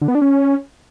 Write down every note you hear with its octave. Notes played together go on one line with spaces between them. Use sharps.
D3
B3
D4
C#4